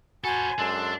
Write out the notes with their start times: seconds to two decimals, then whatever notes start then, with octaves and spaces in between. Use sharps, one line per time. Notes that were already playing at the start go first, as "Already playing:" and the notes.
0.24 F#4 A4 C5 G#5 B5
0.58 F#2 G#3 D4 A4 C6